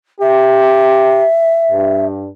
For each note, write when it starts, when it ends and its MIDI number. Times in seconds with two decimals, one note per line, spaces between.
0.21 1.25 67
0.21 2.05 76
1.71 2.29 43